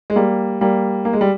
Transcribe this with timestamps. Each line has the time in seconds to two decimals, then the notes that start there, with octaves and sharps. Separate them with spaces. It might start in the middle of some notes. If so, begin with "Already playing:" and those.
0.10 G#3
0.16 G3 A#3
0.61 G3 A#3
1.05 A#3
1.13 G#3
1.21 G3